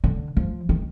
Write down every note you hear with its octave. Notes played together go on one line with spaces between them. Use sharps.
D3
F3
D#3